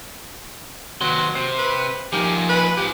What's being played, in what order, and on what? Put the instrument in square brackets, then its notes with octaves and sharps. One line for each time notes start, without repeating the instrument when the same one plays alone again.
[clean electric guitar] D#2 B4 C6 [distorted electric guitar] C3 F#4 [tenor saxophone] F#3
[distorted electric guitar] C3 [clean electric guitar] C5
[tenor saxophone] B4
[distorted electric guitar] A#2 G#3 [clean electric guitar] F3 D#4 A#4 [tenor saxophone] G4
[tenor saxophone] B4
[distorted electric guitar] G#2 F3 [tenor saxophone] G4